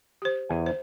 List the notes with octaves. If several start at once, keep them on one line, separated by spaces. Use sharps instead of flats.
G4 C5
E2 G#5
C5